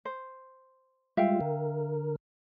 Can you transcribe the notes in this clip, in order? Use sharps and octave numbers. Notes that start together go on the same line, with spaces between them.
C5
G3 G#3 F4 E5 F5 G5
D3 A#4